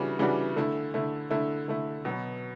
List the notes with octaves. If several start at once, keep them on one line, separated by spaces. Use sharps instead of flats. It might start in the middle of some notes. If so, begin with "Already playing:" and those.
Already playing: C#3 E3 G3 D4 F#4
C#3 E3 G3 D4 F#4
D3 A3 E4
D3 A3 E4
D3 A3 E4
D3 A3 E4
B2 F#3 B3